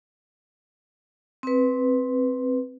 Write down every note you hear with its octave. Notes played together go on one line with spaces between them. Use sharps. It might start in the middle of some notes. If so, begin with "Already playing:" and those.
C4 B4